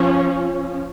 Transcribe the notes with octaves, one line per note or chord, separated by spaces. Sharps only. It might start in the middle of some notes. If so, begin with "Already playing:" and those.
Already playing: F3 C#4